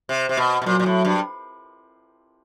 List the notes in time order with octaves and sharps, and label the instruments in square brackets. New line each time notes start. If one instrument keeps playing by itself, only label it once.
[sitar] C3
C3
B2
B2
[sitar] A#2 [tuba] F#3
[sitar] A#2
A2
G2